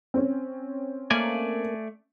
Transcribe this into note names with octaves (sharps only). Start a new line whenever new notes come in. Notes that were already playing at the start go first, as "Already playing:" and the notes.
C4 C#4
A3 A#3 D5 G#5